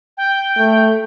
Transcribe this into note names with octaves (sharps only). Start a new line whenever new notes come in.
G5
A3